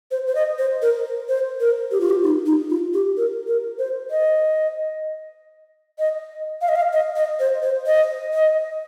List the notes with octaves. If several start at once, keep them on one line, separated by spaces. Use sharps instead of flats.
C5
C5
D#5
C5
A#4
C5
A#4
G4
F4
G4
D#4
D#4
F4
G4
A#4
A#4
C5
D#5
D#5
F5
D#5
F5
D#5
D#5
C5
C5
D#5
D#5